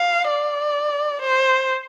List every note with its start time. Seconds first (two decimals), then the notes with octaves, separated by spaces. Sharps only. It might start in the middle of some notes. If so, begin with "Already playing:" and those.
Already playing: F5
0.29 D5
1.21 C5